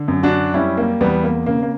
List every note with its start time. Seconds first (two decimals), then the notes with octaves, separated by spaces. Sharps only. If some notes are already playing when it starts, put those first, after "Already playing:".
Already playing: D3
0.08 F#2
0.23 D4 F#4
0.54 G3 C#4 E4
0.77 A#3
1.00 E2 G3 B3
1.24 A#3
1.46 C#3 A#3
1.63 A#3